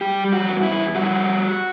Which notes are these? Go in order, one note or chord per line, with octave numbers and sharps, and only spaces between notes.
G3 G4
F#4
E2
E4
G3 F#4